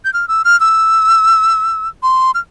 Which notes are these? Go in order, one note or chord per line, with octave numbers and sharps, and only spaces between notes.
G6
F6
E6
F6
E6
C6
F6